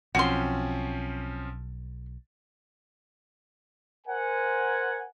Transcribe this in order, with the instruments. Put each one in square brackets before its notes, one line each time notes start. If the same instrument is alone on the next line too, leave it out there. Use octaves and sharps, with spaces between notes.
[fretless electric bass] B1 [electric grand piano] F3 C4 C#4 [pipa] F#4 C6
[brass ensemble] A#4 C5 F#5 G#5